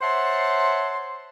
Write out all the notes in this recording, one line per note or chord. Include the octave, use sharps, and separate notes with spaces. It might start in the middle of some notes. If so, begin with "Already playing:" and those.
C5 C#5 E5 F#5 A5 C6